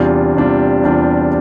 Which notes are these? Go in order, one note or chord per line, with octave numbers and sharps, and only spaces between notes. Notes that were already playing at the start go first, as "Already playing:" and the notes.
Already playing: E2 C3 G3 D4 F4
E2 C3 G3 D4 F4
E2 C3 G3 D4 F4